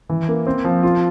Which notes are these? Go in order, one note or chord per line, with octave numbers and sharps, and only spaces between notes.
E3
A#3
C4
F3
F4